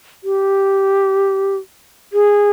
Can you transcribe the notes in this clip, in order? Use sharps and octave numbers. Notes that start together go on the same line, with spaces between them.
G4
G#4